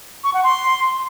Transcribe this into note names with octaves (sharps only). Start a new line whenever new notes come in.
C#6
F#5
C6